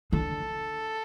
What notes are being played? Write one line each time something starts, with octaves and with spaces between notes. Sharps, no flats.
D3 A4